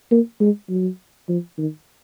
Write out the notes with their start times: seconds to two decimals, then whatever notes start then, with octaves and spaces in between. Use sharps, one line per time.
0.11 A#3
0.41 G#3
0.70 F#3
1.29 F3
1.58 D#3